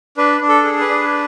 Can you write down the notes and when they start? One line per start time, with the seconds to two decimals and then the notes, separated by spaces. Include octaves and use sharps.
0.17 D4 B4
0.41 D4
0.49 A4
0.65 G#4
0.80 B4
0.89 D4